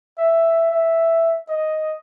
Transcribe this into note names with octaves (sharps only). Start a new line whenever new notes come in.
E5
E5
D#5